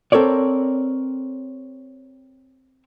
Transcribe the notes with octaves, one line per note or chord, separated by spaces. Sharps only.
C4 A4 A#4 C#5 D5